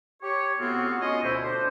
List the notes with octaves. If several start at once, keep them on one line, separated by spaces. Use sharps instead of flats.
G4 C#5
A2 B3 C4 F4 F#4
C#4 F4 C#5 D#5 C6
D2 B2 E4 C5
D4 C5